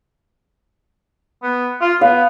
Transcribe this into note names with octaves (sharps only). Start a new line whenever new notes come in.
B3
F4
B3 F5